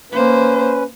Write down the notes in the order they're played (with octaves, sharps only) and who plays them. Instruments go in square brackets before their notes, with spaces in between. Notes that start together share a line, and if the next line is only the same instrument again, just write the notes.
[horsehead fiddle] A#3 C5 [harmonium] C#4 B4